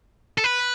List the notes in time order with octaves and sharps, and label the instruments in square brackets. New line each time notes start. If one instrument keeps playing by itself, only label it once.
[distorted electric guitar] A4
B4